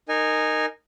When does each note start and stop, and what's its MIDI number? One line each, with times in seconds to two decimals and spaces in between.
0.08 0.66 63
0.08 0.66 70
0.08 0.66 80